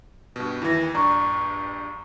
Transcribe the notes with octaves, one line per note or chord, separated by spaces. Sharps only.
G2 B2
D#2 E3 E4 A#6
A#1 G2 D5 A#5 C#6